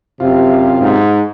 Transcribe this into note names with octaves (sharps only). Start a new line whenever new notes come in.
F#2 C3 F4
G#2